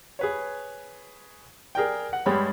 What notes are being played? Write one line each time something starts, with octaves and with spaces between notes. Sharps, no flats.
G#4 B4 C#5
G#4 A#4 D5 G5
F#5
G2 G3 G#3 C#5 B5